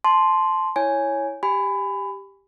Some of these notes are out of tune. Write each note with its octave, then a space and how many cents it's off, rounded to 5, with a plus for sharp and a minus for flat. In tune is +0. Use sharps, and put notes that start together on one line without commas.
A5 -20 C6 +0
E4 -5 C#5 +0 G#5 +0
G4 +0 G#5 -10 B5 +20